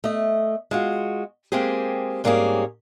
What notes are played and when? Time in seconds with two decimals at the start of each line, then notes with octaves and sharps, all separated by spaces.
0.04 A3 D#5
0.71 G#3 F4 F#4
1.52 G#3 A#3 C4 G4 G#4
2.24 G#2 G3 A#3 C4 C#4 G#4